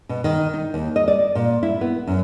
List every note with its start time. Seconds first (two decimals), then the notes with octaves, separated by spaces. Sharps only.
0.09 B2
0.24 D#3
0.54 D#4
0.74 D#2
0.96 D#5
1.08 D5
1.35 A#2
1.63 E4
1.81 B3
2.07 F#2